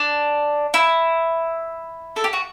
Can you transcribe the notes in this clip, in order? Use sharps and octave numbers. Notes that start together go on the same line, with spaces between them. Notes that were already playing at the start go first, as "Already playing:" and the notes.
Already playing: D4
E4
A4
G4
F#4